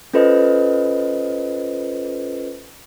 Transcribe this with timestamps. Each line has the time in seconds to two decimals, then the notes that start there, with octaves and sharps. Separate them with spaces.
0.14 C#4 F4 A4 B4 C5 D#5